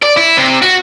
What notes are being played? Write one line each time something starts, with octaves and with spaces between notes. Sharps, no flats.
D5
E4
C3
F#4